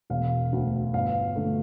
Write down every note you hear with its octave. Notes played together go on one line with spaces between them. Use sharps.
E1 F5
D2 D3
G1 F5
D3 A3